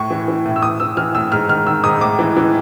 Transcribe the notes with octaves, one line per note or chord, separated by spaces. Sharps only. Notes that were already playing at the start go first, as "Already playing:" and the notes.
Already playing: A2 C#6
E3
E3
A2
E6
A2 D#6
E3 E6
E3 F6
A2 E6
G#2 F6
D#3 F6
D#3 E6
G#2 D#6
A2 D6
E3
E3